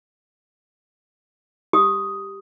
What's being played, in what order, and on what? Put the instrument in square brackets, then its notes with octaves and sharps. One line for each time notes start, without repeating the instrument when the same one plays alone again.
[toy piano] G4 D#6